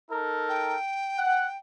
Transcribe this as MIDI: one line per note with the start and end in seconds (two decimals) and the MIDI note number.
0.11 0.76 63
0.11 0.76 69
0.11 0.76 70
0.49 1.57 79
1.19 1.47 78